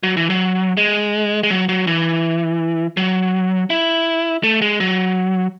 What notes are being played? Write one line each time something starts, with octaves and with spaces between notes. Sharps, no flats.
F#3
E3
F#3
G#3
G#3
F#3
F#3
E3
F#3
E4
A3
G#3
F#3